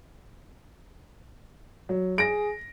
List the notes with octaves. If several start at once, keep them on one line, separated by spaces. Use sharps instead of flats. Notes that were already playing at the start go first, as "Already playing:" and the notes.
F#3
G#4 A#6 D7